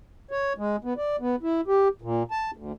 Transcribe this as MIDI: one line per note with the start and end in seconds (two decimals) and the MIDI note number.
0.31 0.53 73
0.58 0.76 56
0.84 0.94 59
0.97 1.16 74
1.20 1.36 59
1.43 1.61 64
1.67 1.88 67
2.02 2.23 46
2.31 2.51 81
2.56 2.72 38